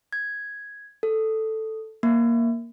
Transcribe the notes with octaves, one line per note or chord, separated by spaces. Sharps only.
G#6
A4
A#3